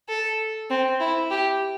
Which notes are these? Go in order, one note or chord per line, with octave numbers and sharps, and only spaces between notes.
A4
C4
E4
G4